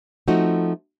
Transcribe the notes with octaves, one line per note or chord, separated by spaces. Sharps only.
F3 A3 C4 D#4 F#4